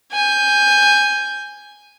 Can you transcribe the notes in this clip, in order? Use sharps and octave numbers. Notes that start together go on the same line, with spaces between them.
G#5 G6